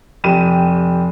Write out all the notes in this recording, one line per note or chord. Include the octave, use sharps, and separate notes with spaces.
F1 G4 D#7 E7